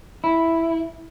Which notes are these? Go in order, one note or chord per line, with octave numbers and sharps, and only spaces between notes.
E4